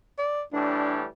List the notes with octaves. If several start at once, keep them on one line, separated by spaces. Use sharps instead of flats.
D5
A2 E3 G3 D4